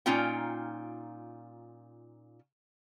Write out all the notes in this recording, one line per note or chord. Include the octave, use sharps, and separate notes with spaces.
A#2 C#4 D#4 F4 G5